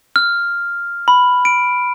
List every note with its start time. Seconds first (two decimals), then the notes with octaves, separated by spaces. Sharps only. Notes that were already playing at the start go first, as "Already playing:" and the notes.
0.16 F6
1.08 B5
1.45 D7